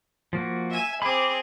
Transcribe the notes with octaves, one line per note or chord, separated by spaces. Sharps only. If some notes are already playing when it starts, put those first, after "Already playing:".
F3 A#3 F#4
E5 G#5
C4 G#4 B5 D6